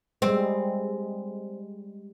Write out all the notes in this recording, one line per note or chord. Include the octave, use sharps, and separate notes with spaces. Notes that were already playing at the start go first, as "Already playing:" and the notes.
G3 G#3 C4